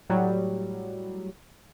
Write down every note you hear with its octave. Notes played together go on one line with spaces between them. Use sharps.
A2 F#3 G3